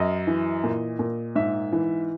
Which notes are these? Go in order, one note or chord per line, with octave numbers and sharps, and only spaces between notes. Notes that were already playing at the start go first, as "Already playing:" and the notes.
Already playing: F#2 D#5
E3
A#2
A#2
G#2 E5
E3